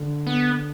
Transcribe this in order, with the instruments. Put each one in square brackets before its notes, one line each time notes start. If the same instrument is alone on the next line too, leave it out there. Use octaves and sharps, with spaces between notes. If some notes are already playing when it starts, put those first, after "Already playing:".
Already playing: [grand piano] D3
[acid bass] B3